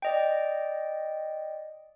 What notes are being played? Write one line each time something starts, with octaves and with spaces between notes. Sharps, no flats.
D5 D#5 G5